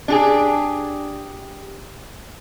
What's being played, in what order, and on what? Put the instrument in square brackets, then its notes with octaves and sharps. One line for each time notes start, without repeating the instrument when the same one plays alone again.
[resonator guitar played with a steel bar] D4 G4 G#4